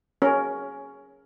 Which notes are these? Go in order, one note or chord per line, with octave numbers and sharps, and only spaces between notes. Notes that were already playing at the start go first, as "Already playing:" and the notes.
C#4 A#4